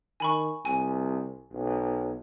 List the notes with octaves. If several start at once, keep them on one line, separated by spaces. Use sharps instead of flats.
D#3 G#5 B5 C#6
C2 G#5
B1